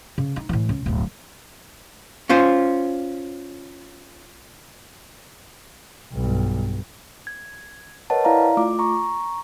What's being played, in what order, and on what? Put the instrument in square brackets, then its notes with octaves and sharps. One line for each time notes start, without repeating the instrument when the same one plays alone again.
[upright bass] C#3
D#4
A2 E3
C#2
D1 G1
[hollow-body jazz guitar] C#4 F4 C5
[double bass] B1 G2
[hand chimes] G#6
A#4 B4 C#5 D#5 F#5 A5
E4 D5 F5 A#5
A3 F4 D6
A#5 C#6